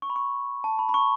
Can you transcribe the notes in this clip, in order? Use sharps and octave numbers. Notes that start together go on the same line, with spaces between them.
C#6
B5
C#6
A5
B5
B5
C#6